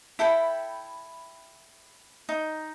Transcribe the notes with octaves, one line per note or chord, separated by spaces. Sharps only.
E4 A4 G5 B5
D#4